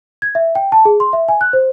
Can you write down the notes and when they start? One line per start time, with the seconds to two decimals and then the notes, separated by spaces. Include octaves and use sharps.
0.22 G#6
0.35 E5
0.55 G5
0.72 A5
0.85 G#4
1.00 C6
1.13 E5
1.28 G#5
1.41 F#6
1.53 C5